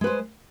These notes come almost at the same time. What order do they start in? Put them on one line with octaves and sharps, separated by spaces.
G#3 B4 C5